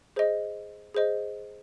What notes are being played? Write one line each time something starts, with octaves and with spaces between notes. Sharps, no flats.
G#4 C5 D#5
G#4 C5 D#5